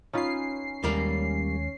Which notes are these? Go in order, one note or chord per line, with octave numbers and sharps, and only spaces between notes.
C#4 D#4 F4 B4 C7
D#2 G3 G#3 A#3 A#4